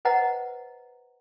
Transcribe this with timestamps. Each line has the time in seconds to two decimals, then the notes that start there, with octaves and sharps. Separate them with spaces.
0.05 B4 C5 D#5 F#5 A#5